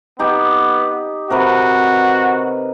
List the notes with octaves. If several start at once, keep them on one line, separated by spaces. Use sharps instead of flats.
B3 D#4 G4
C3 F#4 A#4 B4